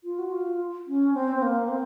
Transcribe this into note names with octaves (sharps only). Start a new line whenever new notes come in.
F4
F#4
F4
C#4
C4
C4
A#3
C4